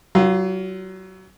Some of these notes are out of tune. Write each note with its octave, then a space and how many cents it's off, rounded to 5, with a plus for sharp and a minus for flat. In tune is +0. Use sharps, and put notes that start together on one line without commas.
F#3 +30 F4 +0